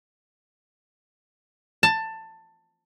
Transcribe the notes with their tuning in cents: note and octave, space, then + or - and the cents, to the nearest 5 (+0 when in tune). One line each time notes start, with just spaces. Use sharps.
A5 +15